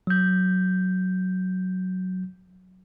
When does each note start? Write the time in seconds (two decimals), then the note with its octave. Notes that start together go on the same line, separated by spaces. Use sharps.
0.07 F#3 G6